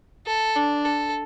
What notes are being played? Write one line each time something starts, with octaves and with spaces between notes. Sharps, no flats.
A4
D4
A4